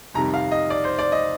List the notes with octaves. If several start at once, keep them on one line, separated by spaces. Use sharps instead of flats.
F2 C3 D#3 G3 A#5
F5
D#5
D5
C5
D5
D#5